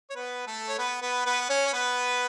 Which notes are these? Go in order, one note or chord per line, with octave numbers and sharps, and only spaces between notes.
C#5
B3 B4
A3 A4
C#5
B3 B4
B3 B4
B3 B4
B4
C#4 C#5
C#5
B3 B4